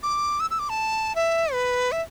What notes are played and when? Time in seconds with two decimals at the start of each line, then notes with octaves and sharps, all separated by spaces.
0.03 D6
0.40 E6
0.50 E6
0.59 D6
0.69 A5
1.15 E5
1.53 B4
1.92 E5